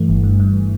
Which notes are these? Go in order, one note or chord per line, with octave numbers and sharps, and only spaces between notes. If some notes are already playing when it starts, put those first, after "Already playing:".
Already playing: G2 E3 A3
G1
G2
G2